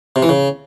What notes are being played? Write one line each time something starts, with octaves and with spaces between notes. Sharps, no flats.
C3
E3
C#3